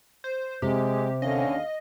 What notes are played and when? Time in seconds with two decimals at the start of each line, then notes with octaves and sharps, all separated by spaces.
0.24 C5
0.62 C3 G#3 G4
1.22 D#2 D3 C#4 D#5 F5